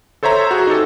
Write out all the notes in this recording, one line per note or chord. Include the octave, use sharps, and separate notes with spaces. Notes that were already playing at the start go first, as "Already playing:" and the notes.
A4 C5 C#5 E5 A#5
F#4 G#4
D#4 G4 A4